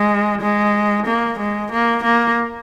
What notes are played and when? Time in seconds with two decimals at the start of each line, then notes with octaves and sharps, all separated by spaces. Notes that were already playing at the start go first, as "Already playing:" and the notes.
Already playing: G#3
0.41 G#3
1.06 A#3
1.39 G#3
1.72 A#3
2.03 A#3